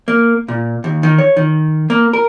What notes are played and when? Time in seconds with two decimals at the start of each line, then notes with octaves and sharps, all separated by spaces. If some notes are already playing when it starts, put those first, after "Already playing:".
0.08 A#3
0.48 A#2
0.84 D#2
1.03 D#3
1.18 C#5
1.37 D#3
1.90 A#3
2.13 A#4